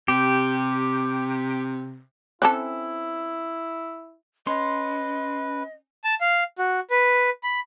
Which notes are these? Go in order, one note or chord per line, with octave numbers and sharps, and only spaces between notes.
C3 G4
C4 C#4 E4 A4 A5 D6 F#6
C#4 B4 D#5 C6
A5
F5
F#4
B4
B5